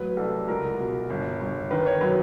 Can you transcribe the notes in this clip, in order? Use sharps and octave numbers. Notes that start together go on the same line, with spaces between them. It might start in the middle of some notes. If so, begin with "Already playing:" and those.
Already playing: A1 F#3 B4
C2 A4
C#2 A#4
B2
G1
G1
D#3 B4
C#5
F#3 B4